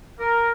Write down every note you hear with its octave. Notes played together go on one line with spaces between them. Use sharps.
A#4